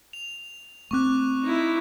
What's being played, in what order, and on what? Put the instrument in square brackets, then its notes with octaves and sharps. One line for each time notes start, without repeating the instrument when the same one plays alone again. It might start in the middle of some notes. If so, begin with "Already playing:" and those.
[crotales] F7
[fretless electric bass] A3 C4 [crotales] C#6 D6 F#6
[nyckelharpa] D#4 E4